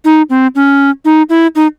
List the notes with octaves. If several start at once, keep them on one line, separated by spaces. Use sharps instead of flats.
D#4
C4
C#4
D#4
E4
D#4